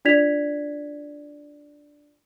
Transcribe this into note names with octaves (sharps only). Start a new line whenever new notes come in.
D4 F4 D5 G#6 B6 F7